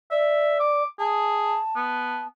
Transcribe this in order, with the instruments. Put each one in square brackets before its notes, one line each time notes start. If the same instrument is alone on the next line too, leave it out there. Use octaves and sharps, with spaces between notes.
[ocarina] D5 [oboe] E5
[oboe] D6
[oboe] G#4 [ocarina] A5
[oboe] B3